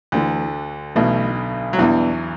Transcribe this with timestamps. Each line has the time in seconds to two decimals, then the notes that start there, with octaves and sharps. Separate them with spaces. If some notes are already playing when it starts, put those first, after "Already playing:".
0.12 D2 D3 E3 A3 E4 A4
0.95 B1 B2 E3 A3 E4 A4
1.73 F#3
1.78 E2 B2 E3 G3 B3 D4